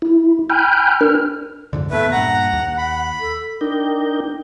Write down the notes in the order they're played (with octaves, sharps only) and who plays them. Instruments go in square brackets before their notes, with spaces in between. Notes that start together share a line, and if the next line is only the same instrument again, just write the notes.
[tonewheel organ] E4
G5 G#5 B5 F6 G6
D4 A#4 F6
[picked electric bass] F2 G#2 D3
[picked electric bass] D#2 A2 B3 [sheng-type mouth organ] A3 B4 [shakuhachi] E5
[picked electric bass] G2 A#2 [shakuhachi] F#5 [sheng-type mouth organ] A#5
[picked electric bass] D#2
[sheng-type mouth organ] B5
[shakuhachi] A4
[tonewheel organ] D4 D#4 A#4 G5